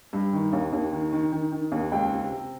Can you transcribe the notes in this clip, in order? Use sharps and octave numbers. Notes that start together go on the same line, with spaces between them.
G2
D#3
D#2
D#2
D#3
D#3
D#3
D#3
D#2
C#2 G5
C3
C3